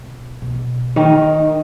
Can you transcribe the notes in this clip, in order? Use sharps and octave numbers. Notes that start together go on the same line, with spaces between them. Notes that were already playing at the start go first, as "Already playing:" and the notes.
Already playing: B2
B2
D#3